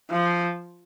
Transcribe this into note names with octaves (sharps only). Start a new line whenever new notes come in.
F3